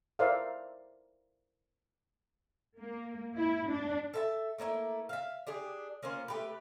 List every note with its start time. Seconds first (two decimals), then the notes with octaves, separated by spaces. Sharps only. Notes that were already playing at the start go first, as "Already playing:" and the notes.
0.19 E4 A#4 C5 D5 E5 F5
2.79 A#3
3.37 E4
3.70 D4
4.14 A4 E5 A5
4.58 A3 A#3 C#4 E4
5.09 E5 F5
5.47 D4 G4 G#4
6.03 A#3 C#4 F4 C5
6.28 A3 G4 B4